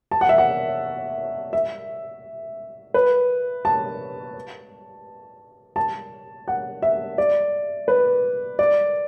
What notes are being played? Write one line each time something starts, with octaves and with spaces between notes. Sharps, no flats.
A5
F#5
E5
F#5
E5
B4
A5
A5
F#5
E5
D5
B4
D5